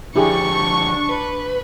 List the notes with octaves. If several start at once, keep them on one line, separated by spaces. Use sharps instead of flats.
D3 F3 D4 E4 G4 G#4 C#6
B4